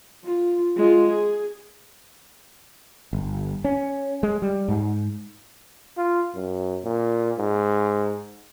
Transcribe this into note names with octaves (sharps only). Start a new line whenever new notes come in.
F4
G#3 F4
G#4
G1
C#4
G#3
G3
G#2
F4
F#2
A#2
G#2